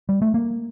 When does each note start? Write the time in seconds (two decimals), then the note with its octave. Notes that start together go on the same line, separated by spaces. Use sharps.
0.09 G3
0.22 A3
0.34 A#3